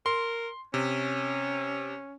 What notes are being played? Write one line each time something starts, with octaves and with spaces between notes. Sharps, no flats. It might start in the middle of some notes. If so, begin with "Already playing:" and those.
A#4 C6
C3 C#4